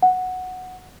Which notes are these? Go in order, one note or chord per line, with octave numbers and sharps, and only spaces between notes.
F#5